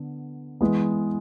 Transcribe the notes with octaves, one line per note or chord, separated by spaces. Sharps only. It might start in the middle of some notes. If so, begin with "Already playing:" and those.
Already playing: D3 B3
E3 G#3 B3